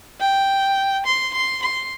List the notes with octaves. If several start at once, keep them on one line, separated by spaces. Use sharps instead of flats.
G5
C6
C6
C6